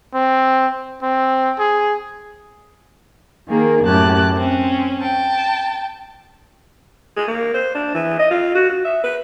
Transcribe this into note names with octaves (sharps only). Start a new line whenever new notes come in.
C4
C4
G#4
D#3 A#3 G#4
F#2 A2 G4 A5 F#6
C4 C#4
G5 A5
G#4
A#3
C5
D4
E3
D#5
F4
F#4
F#4
E5
B4